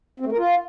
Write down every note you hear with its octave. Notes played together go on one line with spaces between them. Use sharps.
C4
A3
A#4
F4